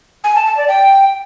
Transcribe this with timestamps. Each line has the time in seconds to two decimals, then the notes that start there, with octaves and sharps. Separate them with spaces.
0.24 G#5
0.35 A5
0.46 A5
0.57 D5
0.68 G5